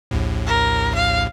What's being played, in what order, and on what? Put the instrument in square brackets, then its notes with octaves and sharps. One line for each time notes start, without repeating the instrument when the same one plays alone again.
[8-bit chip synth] A#1 D#2 A2
[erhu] A#4
F5